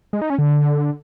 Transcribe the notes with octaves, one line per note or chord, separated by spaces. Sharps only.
G#3
D#4
C#4
D3